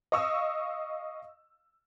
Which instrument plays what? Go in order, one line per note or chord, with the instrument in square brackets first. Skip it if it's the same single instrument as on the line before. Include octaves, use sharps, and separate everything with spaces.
[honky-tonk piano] D#5 F5 C#6 D#6 E6